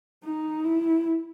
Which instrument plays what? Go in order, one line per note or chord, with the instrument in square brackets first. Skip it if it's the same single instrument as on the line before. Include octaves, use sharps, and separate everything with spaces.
[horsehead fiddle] D#4
E4